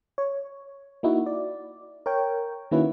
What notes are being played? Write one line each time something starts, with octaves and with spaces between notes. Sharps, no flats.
C#5
A#3 D#4 E4 F#4
D5
A#4 C#5 G5
D#3 A#3 C#4 E4 F#4 B4